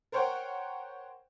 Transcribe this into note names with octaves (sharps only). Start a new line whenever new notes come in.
A#4 C5 C#5 F#5 G5